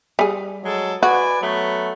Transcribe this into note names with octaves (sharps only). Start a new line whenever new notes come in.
G3 G#4
F#3 G#3 A4
F#4 B4 D5 G#5
F#3 A3 B3